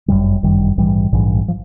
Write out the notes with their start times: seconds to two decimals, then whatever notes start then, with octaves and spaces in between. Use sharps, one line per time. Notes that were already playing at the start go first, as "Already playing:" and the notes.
0.08 G1 F#2 D#3 G3
0.43 G1 F#2 D#3 G3
0.78 A#1 G#2 E3 G3
1.13 A#1 G#2 E3 G3
1.48 F3